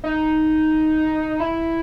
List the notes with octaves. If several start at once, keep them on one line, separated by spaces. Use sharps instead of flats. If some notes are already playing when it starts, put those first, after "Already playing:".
D#4
E4